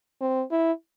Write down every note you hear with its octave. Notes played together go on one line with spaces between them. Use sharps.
C4
E4